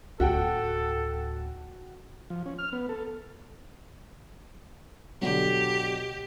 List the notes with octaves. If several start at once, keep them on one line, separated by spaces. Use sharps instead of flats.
D1 D2 F#4 A4 F#5 G5
F3
C#4
F6
B3
A4
B2 D3 F#3 G4